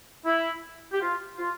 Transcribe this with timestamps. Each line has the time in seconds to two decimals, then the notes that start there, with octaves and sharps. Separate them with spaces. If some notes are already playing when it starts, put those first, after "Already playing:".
0.26 E4
0.93 G4
1.01 F4
1.38 F4